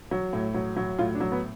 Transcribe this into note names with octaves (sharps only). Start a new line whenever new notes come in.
F#3
A2
F#3
F#3
A2 F4
D4
F#3
B3